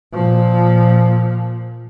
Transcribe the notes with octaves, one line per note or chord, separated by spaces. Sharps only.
A#2 F3